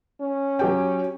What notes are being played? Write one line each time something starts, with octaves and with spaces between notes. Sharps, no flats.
C#4
F#3 G4 G5